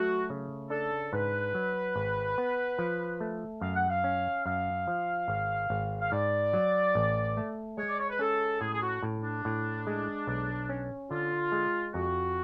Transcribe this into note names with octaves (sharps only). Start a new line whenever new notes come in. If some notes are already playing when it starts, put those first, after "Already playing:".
Already playing: F#3 A3 F#4
C#3
D4 A4
G#2 B4
F#3
G#1
B3
F3
A3
F#2 F5
F#5
F5
C#4
F#2 F5
F3
G#1
G#1
F5
G#2 D5
F#3
A1
A3
G#3 C#5
D5
C#5
B4
C#4 A4
A2 G#4
G#4
F#4
A2
D4
A2
G#3
B1
C#4
D3 F4
G#3
F2 F#4